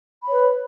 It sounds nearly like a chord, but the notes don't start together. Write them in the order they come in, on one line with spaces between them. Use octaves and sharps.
B5 C#5 B4